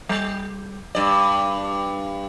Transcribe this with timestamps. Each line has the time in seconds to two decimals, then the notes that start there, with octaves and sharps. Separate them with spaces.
0.09 G3
0.95 G2 D5